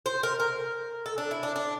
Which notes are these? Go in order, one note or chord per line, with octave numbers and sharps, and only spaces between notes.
C5
A#4
A#4
A4
D4
E4
D4
D4